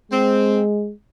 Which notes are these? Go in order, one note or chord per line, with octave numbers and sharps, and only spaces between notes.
G#3 C4